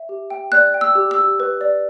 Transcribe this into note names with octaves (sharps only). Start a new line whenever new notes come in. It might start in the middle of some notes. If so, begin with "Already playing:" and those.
Already playing: E5
G4
G5
D5 F#6
G5
E6
G4
E6
G4
B4
D5